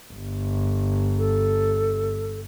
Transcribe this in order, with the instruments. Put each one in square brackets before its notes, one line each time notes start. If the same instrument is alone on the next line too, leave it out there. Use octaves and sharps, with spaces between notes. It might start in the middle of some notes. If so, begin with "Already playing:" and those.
[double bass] G1
[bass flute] A4